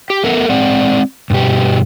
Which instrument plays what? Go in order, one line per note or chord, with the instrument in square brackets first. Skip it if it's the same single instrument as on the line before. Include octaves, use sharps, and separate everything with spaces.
[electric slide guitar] G4
B3 A4 A#4 E5 F#5
G#3 C4 D5 F#5
G2 B2 G4